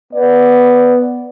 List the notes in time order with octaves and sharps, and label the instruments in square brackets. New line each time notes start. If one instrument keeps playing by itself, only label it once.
[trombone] B3 [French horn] D5